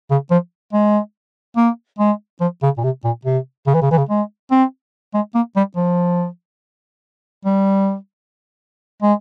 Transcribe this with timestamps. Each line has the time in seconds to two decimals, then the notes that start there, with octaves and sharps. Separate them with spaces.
0.10 C#3
0.31 F3
0.73 G#3
1.57 A#3
1.99 G#3
2.40 F3
2.63 C#3
2.78 A#2
2.83 C3
3.04 A#2
3.25 C3
3.67 C#3
3.74 E3
3.82 C#3
3.91 E3
3.98 C#3
4.09 G#3
4.51 C4
5.14 G#3
5.35 A#3
5.56 G3
5.76 F3
7.45 G3
9.02 G#3